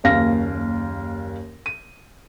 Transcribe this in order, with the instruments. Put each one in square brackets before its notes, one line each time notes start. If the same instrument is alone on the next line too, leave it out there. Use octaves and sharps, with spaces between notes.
[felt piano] F#1 D#2 C#4 F5 A#6
D#7